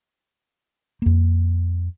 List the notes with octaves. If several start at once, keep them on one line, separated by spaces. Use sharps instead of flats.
F2 A#3